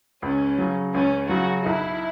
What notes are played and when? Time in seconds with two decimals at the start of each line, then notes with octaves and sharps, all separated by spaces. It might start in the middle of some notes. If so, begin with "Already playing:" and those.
0.22 C#2 C#4
0.58 C#3 F#3
0.94 C#2 C#4
1.29 C#3 F#3 F#4
1.65 B1 E4